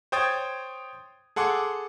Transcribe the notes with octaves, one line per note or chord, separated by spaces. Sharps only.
C5 C#5 G5 D#6 G#6 A6
G#4 A4 F#5 C6 D6